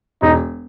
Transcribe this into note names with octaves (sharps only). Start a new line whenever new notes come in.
E1 D#4